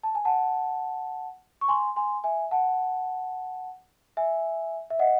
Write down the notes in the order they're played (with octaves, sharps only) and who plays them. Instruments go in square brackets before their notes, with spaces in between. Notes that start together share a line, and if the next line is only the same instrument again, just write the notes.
[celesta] A5
G#5
F#5 A5
C#6
G#5 C6
G#5 C6
E5 G#5
F#5 A5
E5 G#5
E5
D#5 F#5